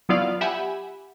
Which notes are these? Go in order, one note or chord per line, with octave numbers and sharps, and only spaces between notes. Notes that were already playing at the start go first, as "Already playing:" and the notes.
F#3 B3 E4 F4 D5 F5
G4 E5 F#5 G#5 B5